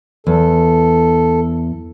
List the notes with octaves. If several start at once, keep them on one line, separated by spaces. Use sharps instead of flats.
E2 A4